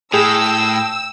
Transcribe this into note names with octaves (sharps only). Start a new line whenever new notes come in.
A2 G#4 G5 E6